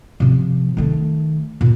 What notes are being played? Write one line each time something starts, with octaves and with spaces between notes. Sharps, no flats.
C3 F3
D#3 A3
A#2